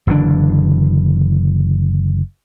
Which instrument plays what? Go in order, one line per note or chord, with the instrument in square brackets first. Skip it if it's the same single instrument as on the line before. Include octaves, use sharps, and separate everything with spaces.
[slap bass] F#1 D3 E3 D4